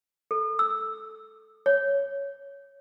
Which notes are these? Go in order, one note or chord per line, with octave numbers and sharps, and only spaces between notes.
A4
E6
C#5